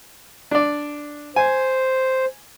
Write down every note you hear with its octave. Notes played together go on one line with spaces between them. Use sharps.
D4 D5
C5 G#5